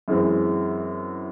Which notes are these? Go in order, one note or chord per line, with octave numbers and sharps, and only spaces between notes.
F#2 E3 G#3 C4